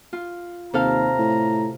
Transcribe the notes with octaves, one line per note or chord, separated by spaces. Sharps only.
F4
D#2 C3 A4 F5 A#5
A2